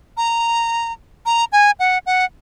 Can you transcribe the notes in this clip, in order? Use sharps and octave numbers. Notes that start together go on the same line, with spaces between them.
A#5
A#5
G#5
F#5
F#5